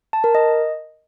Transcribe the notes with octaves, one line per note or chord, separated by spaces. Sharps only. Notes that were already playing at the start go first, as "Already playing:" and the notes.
A5
A#4
D#5